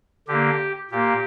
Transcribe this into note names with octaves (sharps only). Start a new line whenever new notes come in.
D3 A#3 G4
A#2 A#3 G4